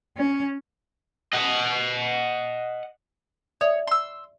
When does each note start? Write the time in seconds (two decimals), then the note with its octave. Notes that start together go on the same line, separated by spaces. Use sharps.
0.17 C#4
1.33 D#5 F#5
3.61 C#5 D5 E5 D#6
3.87 C6 E6